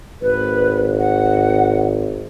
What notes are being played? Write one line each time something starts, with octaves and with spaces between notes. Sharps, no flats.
G#1 B4
F#5